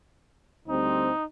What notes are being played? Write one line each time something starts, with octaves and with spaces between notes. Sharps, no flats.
D2 G3 C4 D#4